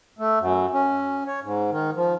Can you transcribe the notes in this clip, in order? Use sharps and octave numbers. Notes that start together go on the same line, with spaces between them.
A3
F#2
C#4
C#5
G#2
D#3
F3